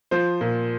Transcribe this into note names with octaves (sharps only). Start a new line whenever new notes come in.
F3 C5
A#2